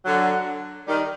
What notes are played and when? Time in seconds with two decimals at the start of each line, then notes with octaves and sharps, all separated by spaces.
0.06 D3 F#3
0.87 D#3 G3